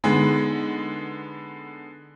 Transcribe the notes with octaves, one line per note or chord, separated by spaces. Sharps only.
D3 G#3 B3 D#4